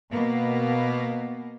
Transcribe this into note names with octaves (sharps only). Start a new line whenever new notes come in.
B2 A#3 B3